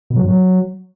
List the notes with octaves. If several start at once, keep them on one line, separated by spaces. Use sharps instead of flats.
B2
F#3
G#2
F#3